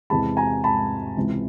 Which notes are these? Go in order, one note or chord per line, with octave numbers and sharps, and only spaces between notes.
E2 C3 E3 G#3 A5 B5
G#5 A#5
A5 B5
C#2 C3 E3